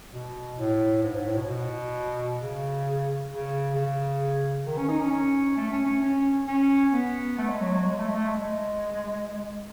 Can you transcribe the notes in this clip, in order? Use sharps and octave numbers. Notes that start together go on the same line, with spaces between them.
B2
A2
G#2
G#2
A2
B2
B2
C#3
C#3
C#3
D#3
C#4
D#4
C#4
C#4
A3
C#4
C#4
C#4
C#4
B3
A3
G#3
F#3
F#3
G#3
A3
G#3
A3
G#3